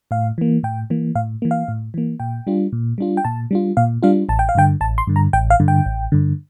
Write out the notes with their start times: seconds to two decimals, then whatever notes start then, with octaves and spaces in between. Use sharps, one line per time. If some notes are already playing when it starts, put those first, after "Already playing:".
0.11 A2 F5
0.38 E3 A#3
0.63 A2 G5
0.90 E3 A#3
1.15 A2 F5
1.42 E3 A#3
1.51 F5
1.68 A2
1.94 E3 A#3
2.20 A#2 G5
2.47 G3 D4 F4
2.73 A#2
2.98 G3 D4 F4
3.17 G5
3.25 A#2 A5
3.51 G3 D4 F4
3.77 A#2 F5
4.03 G3 D4 F4 F5
4.29 A1 A5
4.39 G5
4.49 F5
4.55 G2 D3 G5
4.81 A1 A5
4.98 C6
5.07 G2 D3
5.16 A#5
5.33 A1 G5
5.50 F5
5.60 G2 D3
5.68 G5
5.86 A1
6.12 G2 D3